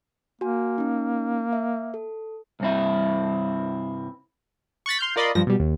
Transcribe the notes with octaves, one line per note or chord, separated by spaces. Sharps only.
A#3 F#4 G#5
C#4 D#4
E5
A4
C2 G2 C4 E4
C#6 F#6 A6 B6
C6 F6 G6
F4 A#4 D5 D#5 B5 C6
G2 F3 A#6
B2 G3
D#2